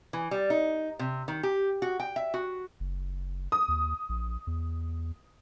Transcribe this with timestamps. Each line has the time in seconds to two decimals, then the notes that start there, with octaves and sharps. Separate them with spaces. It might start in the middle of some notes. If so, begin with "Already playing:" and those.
0.13 E3
0.31 G3
0.50 D#4
0.99 C3
1.28 D#3
1.43 G4
1.82 F#4
2.00 G5
2.16 E5
2.34 F#4
2.80 F#1
3.52 D#6
3.68 D#2
4.09 A#1
4.47 E2